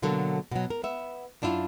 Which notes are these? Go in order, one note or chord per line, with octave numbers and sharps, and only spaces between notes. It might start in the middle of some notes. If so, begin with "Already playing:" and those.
B2 D3 F#3 A#3 A4
B2 F#3
A#4
B3 E5
F#2 D4 E4 F4